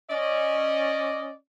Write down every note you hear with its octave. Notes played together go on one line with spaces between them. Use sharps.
C#4 D5 D#5